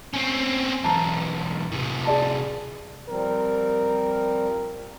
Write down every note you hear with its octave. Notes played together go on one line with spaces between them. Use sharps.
C4 C#4
B1 E2 A5 A#5
A2 C3
G#4 D5 A5
F3 G3 C4 A#4